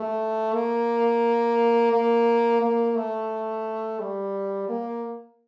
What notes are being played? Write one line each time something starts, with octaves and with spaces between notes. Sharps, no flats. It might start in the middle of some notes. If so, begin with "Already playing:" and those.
Already playing: A3
A#3
A#3
A#3
A3
G3
A#3